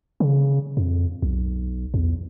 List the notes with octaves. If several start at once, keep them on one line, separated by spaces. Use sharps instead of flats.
C#3
F2
B1
E2